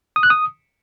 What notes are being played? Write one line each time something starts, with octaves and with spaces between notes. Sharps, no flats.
D#6
F#6
D#6